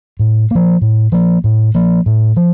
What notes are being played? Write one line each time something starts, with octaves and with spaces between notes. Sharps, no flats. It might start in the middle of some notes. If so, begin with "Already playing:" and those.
A2
F3 A#3
A2
F3 A#3
A2
F3 A#3
A2
F3